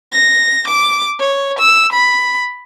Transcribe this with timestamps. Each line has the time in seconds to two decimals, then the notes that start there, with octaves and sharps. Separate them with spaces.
0.12 A#6
0.68 D6
1.19 C#5
1.59 E6
1.92 B5